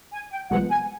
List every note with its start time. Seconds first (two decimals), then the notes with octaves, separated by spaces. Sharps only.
0.12 G#5
0.31 G5
0.50 C2 C3 F3 G#3 B3 F#5
0.70 G#5